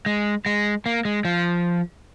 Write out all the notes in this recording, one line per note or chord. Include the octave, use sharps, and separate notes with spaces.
G#3
G#3
A#3
G#3
F3